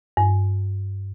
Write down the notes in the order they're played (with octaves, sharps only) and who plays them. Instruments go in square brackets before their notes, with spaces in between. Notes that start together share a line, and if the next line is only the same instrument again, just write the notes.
[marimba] G2